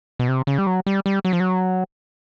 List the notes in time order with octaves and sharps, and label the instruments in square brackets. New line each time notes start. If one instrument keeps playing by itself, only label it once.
[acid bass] B2
C3
C#3
G3
F#3
G3
G3
F#3
F3
F#3